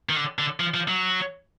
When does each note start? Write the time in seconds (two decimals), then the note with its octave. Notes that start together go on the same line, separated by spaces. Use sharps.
0.09 D#3
0.16 D3
0.39 D3
0.60 F3
0.74 F3
0.88 F#3